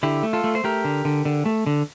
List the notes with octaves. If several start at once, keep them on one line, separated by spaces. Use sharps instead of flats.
D3 E4 G4
A3
F4 A4
A3
C5
A3 G4 A#4
D3
D3
D3
A3
D3